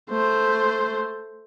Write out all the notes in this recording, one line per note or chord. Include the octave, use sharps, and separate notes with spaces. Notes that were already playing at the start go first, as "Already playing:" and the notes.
A3 C5